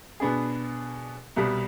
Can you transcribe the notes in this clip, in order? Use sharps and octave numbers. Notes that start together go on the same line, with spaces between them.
B2 B3 D4 G#4
C2 B2 G3